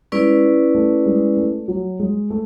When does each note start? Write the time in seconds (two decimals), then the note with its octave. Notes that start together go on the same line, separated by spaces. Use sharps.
0.12 G#3 C#4 E4 B4 D5
0.75 A3
1.06 G#3
1.37 A3
1.68 F#3
2.00 G#3
2.30 A3